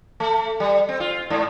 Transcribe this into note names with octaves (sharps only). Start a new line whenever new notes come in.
A3
G3
C4
F4
G#2